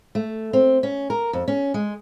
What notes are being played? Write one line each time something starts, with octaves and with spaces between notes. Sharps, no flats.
A3
C4
C#4
A#4
F2
C#4
G#3